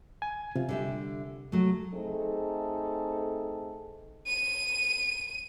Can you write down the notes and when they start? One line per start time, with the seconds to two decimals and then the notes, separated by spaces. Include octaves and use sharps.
0.22 G#5
0.55 C3 F4
0.69 D3 G3 E5
1.52 F#3 A3
1.93 A3 C4 D#4 G#4 A4
4.27 D#7